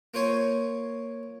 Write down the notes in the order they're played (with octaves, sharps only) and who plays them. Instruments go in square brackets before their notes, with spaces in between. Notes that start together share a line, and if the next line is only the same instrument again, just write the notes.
[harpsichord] A#3 F4 C5 C#5 G#5